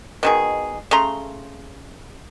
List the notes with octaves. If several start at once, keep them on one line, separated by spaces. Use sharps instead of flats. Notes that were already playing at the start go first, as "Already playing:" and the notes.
B2 D#3 G#4
C#3 A3 A#5 C6